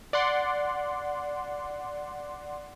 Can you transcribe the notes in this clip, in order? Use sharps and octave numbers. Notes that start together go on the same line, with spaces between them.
D5 F#5 C6